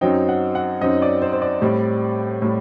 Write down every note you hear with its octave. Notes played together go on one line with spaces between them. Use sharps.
F#2 F#3 C4 D#4 G5
F#5
F#5
F#2 F#3 C4 D#4 D#5
D5
C5
C5
D5
A2 G3 C4
A2 G3